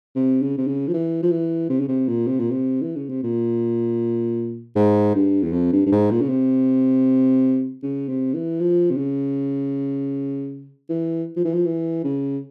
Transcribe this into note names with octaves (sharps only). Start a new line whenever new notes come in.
C3
C#3
C3
C#3
F3
E3
F3
E3
C3
C#3
C3
A#2
C3
A#2
C3
E3
C#3
C3
A#2
G#2
G2
E2
F2
G2
G2
G#2
A#2
C#3
C3
C#3
C3
E3
F3
C3
C#3
E3
F3
E3
F3
E3
C#3